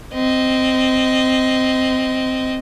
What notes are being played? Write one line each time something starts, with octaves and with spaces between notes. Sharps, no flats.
C4 D#5